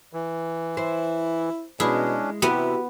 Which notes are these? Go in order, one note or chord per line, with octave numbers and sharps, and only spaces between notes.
E3
E4 C5
B2 G#3 C#4 D4 E4
C3 B3 E4 F#4 G4